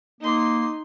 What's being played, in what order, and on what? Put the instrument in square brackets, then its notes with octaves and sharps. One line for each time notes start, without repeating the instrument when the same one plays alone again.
[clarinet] A#3 [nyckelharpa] D#4 C6